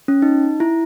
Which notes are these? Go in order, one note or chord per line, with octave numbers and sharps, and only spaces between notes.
C#4
D#4
E4